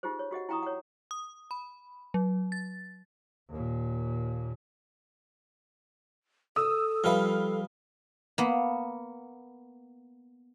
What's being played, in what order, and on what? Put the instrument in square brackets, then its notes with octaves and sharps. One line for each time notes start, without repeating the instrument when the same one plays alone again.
[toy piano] D#4 F4 G4 G#4 C5
C#5
F#4 G4 D#5 F#5
E4 G5 A#5 C#6 D#6
C#5 F#5
[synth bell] D#6
B5
F#3
A6
[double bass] D#2 A#2
[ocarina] A4 [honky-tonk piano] D#6 E6
[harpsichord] F3 G3 B4 [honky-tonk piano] F5 F6
[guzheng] A#3 B3